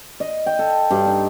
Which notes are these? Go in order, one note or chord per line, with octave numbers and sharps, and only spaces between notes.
D#5
G5
A4
G2
D#4